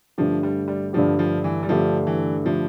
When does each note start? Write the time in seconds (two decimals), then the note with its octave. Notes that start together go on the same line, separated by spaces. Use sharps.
0.18 G2 D3 F3 A3 D4 G4
0.43 G3
0.68 G3
0.93 G2 D3 F3 A3 D4 G4
1.19 F3
1.44 E3
1.63 G3
1.69 G2 D3 F3 A3 D4 G4
2.07 E3
2.46 D3 F3 A3 D4 G4